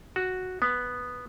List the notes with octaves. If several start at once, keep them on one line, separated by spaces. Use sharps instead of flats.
F#4
B3